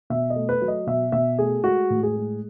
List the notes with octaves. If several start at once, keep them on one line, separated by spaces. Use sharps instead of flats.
B2 E5
D#5
A3
B4
F#3
D#5
B2 E5
B2 E5
A3 G#4
G#3 F#4
A2
G#4
G#3